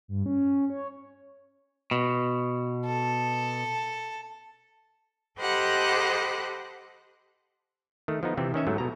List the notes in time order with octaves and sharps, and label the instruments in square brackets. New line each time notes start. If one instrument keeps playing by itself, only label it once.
[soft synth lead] G2
C#4
C#5
[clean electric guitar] B2
[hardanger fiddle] A4
[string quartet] G4 A4 C5 D#5 F#5 B5
[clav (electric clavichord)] D#3 A3
F3 B3 D#4
C3 E3 C4
D#3 C#4 E5 G#5
G#2 F#3 A3
B2 A#5